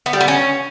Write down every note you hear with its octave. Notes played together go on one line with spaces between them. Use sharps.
B3
G3
B3
C#4